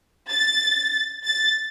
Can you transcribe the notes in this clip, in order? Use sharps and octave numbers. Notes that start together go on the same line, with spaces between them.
A6
A6